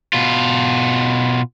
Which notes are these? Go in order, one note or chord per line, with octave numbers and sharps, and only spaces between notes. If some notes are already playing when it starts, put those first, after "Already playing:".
B2 F4